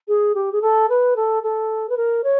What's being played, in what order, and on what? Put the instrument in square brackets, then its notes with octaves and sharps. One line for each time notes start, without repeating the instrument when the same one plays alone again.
[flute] G#4
G4
G#4
A4
B4
A4
A4
B4
A#4
C#5